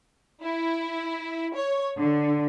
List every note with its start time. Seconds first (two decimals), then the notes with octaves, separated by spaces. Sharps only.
0.44 E4
1.56 C#5
1.99 D3